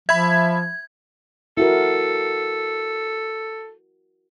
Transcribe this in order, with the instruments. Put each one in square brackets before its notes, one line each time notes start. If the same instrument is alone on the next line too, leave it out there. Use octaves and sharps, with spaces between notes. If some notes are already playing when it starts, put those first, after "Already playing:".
[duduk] F3 [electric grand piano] E5 B5 [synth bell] G#6
[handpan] E4 F#4 A#4 [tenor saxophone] A4